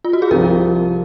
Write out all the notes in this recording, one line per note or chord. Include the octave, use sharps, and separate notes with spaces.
F4
F#4
G#4
C2 C3 F3 A#4